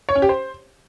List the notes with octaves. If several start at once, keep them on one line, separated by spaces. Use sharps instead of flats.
C#5
C#4
G4
C5